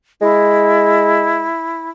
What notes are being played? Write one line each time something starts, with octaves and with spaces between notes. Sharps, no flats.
G#3 E4